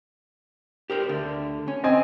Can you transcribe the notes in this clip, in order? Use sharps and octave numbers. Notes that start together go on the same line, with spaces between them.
G4 A#4 C5
D2 D3
C#4
C4 D#5 G#5